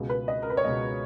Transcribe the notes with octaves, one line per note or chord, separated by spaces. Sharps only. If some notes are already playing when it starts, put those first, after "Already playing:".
Already playing: C#2 B2 G#3
B4
D#5
A#4
B4
C#5
C#2 B2 G#3 D#5